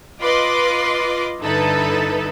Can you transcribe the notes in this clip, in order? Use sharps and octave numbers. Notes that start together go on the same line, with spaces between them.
F4 B4 D#5 C6 D6
G2 D3 D#4 E4 A4 B4